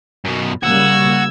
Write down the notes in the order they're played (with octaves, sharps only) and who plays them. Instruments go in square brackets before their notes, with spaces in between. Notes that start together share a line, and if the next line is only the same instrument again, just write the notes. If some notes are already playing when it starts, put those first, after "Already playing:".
[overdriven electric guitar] F#2 B2
[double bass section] C#3 G3 A#3 [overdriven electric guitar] F#4 [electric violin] E6 G#6